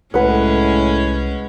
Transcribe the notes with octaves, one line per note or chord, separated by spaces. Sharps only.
C2 A2 G#3 C#4 B4 F#5